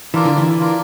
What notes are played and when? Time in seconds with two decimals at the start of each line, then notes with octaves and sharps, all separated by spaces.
0.14 E3 D4 F4 A#4 D5
0.25 D3
0.38 E3
0.59 D4 F4 A#4 D5